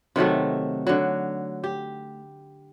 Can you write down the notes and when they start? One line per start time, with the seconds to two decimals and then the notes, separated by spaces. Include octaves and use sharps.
0.16 C3 D#3 F#3 A3
0.87 D3 F#3
1.64 G4